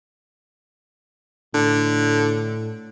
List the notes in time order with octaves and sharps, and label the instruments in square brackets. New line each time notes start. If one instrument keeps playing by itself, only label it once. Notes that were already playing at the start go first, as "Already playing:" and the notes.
[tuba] A2 [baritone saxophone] D3